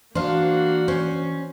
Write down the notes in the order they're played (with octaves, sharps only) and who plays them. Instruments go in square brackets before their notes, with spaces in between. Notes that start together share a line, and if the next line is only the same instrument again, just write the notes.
[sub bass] E3 [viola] A#3 F#4 [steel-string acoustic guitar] D4 [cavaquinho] C5 F5
[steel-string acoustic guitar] C#4 [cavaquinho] C5 C#6